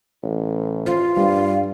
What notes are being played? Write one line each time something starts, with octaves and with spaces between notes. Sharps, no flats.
A1
F4 C5
G2 G3 F5